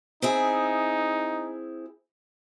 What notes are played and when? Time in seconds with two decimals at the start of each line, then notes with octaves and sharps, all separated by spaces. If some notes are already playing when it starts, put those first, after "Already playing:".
0.22 C4 D#4 E4 G#4